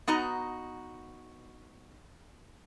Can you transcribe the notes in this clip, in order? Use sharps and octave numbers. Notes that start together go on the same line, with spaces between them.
B3 D#4 F#4 D#5 A#5